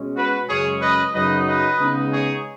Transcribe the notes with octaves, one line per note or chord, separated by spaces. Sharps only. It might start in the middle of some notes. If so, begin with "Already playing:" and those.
Already playing: B2 G#3 C#4
F#4 B4
F#2 C#3 G#3 C#4 G#4 C#5
B4 D#5
F#2 C#3 F#3 D#4 B4 D#5
B4 D#5
C#3 G#3 B3 D#4
G#4 C#5